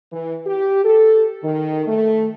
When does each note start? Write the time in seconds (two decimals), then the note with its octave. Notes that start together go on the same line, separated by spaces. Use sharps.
0.12 E3
0.45 G4
0.84 A4
1.43 D#3
1.86 A3